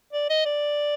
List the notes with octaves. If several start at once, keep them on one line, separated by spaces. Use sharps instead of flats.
D5
D#5
D5